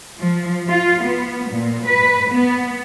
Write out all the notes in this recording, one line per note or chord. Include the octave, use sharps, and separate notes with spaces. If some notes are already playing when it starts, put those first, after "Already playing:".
F3
F4
B3
A#2
B4
B3